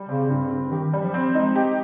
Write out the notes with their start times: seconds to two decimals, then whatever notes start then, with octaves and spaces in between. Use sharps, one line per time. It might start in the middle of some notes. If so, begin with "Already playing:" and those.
Already playing: G3
0.09 C#3 C4
0.30 G2
0.51 G2
0.71 D#3 G4
0.93 G3
1.03 F3
1.14 C4
1.35 G#3 D#4
1.55 G4